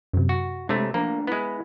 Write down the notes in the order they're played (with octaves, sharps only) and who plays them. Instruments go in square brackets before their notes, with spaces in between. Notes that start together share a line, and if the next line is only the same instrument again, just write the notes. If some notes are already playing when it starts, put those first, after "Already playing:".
[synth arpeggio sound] F#2 C3
[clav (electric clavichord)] F#4
[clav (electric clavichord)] C3 A3 [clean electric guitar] G#3 C#5 [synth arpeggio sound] D4
[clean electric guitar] D2 D4 A#5 [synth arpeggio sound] F3 [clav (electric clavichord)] A#3
[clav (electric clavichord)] G#3 B3 [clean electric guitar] E4